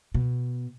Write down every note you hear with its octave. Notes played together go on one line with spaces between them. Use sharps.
B2